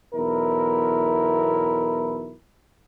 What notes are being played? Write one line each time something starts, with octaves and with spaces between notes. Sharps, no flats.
B1 E2 E4 A#4